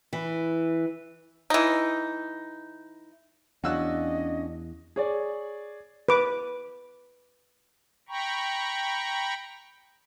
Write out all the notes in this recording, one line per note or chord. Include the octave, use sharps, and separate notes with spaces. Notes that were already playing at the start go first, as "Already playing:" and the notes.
E3
E3 D#4
E2 C#4 D4 F#4 D#5 F5 E6 F#6
G#4 C#5 D5
B4 D6
G5 A#5 B5 C#6